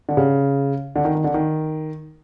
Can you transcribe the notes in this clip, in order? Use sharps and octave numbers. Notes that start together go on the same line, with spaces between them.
D3
C#3
D3
D#3
D#3
D3
D#3